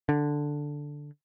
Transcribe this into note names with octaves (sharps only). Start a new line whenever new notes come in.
D3